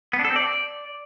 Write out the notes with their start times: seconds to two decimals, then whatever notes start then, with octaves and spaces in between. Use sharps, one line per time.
0.13 B3
0.19 D4
0.25 A4
0.30 C4
0.36 D5